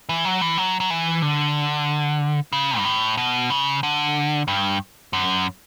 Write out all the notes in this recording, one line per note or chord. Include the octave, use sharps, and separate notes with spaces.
E3
F#3
E3
F#3
F#3
E3
D3
C#3
G2
A2
B2
C#3
D3
G2
F#2